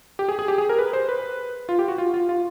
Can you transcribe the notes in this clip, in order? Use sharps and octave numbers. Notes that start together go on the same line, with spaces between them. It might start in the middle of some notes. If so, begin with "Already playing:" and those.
G4
G#4
G#4
G4
G#4
A#4
B4
C5
B4
F4
G4
F#4
F4
F4
F4